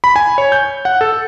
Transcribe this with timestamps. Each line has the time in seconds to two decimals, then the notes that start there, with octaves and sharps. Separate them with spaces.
0.04 B5
0.16 G#5
0.38 C#5
0.52 G6
0.85 F#5
1.01 A4